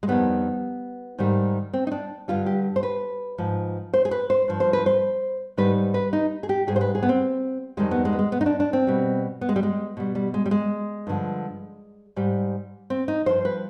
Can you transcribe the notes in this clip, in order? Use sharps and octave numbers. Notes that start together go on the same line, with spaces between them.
G#3
F2 D#3 G3 B3
G#2 D#3 G3
C4
D#4
D4
G2 D3 G3 F4
G4
C5
B4
G#2 F3
C5
G#4
B4
C5
G2 F3
C5
B4
C5
G#2 D#3 G3 B4
B4
D#4
G#4
G4
G#2 G3 G#4
C5
B4
G#4
B3
C4
F2 D#3 G3 G#3
B3
G#3
B3
G#3
B3
D#4
D4
D4
C4
B2 G3
B3
G#3
G3
G#3
B2 G3
G3
G#3
G3
G#3
G2 D3 F3
G#2 G3
C4
D#4
G2 F3 C5
B4